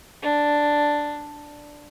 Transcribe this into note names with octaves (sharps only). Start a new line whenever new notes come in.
D4